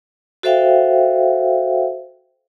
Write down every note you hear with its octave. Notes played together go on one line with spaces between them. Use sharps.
F#4 A4 C5 E5 F5 G5